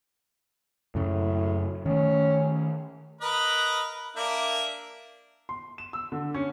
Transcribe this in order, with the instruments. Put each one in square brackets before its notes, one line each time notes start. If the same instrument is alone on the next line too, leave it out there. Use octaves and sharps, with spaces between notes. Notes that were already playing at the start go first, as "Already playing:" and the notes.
[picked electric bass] F#2 C#3 [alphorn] A2
[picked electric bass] D#3 A3 [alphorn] C#4
[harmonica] A#4 B4 D#5
A#3 D4 E5
[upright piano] C6
E7
E6
D3
C#4